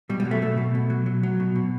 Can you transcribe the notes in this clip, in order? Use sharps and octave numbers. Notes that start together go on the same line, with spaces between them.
B2 G3
G3
F#3
A3
B2 A3
B2
B2
F#3
F#3
F#3
B2
B2